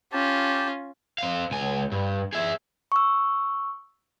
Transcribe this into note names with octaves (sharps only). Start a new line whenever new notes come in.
C#4 F4 G4 A5
C4 F5
C#2 G#5
G2
G#4 E5
C#6 E6